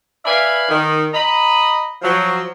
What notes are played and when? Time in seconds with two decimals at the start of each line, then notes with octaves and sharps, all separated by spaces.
0.25 B4 D5 E5 F5 G#5 B5
0.69 D#3
1.13 D#5 A#5 B5
2.02 F3 F#3